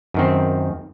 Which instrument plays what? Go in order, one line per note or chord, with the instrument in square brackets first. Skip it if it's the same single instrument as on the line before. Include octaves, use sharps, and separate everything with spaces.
[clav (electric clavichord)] F#2 D#3 C4